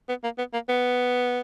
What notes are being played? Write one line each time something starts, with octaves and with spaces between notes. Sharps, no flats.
B3
A#3
B3
A#3
B3